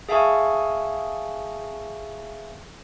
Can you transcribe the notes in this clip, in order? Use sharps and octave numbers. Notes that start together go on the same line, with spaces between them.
G#4 E5 F5 G#5 A5 C#6